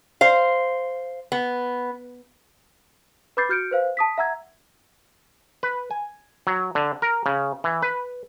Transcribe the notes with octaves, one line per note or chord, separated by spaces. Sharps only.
C5 F5
B3
B4 B5 D6 G6 A6 C7
F#4 F6 G6 C#7 D7
B4 C5 F5
A5 D#6 B6
E5 F#5 A#5 E6 G#6
B4
G#5
F#3
D3
A#4
C#3
E3
B4